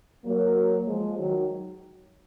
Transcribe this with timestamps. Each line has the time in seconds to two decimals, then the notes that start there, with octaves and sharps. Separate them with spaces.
0.24 F#3 A#3
0.86 F3 G#3
1.17 D#3 F#3